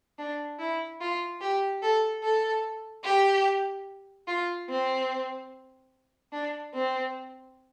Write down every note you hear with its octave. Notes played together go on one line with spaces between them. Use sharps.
D4
E4
F4
G4
A4
A4
G4
F4
C4
D4
C4